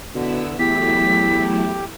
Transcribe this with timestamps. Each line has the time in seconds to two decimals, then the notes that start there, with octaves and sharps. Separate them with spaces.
0.15 B2 D3 B3 E4 E6
0.59 E2 F#3 A3 E4 G4 B6